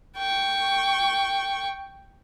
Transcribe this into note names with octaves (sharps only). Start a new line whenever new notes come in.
G5 C#6